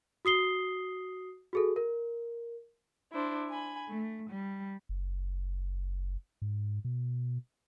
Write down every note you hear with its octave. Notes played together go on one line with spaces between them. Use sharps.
F#4 D#6 C7 G7
F#4 G#4 A4
A#4
D4 E4 C5
G#5 B5
A3
G3
F#1
G#2
B2